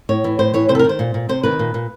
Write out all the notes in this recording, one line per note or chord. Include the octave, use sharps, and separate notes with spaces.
A2 C#5
E3
A2 C5
E3 C#5
C3 C5
A4
A#4
D#3
C5
A#2
A#2
C3 C5
D#3 B4
A#2
A#2